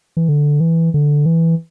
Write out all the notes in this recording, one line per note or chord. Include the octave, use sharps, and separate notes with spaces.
E3
D3
E3
D3
E3